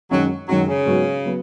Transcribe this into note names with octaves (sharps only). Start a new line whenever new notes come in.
F#2 D#3 F#3 G#3 C#4 F#4
F#2 D#3 F#3 G#3 C#4 F#4
C#3
G#2 F#3 B3 F#4
F#3 B3